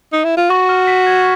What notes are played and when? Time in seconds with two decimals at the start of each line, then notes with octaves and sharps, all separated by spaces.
0.12 D#4
0.24 E4
0.37 F4
0.49 F#4 C#6
0.69 F6
0.87 B6
1.07 G#6